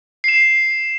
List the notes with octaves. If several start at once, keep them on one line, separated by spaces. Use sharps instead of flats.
C7 E7